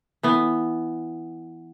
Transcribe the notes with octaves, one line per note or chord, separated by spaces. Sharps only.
E3 B3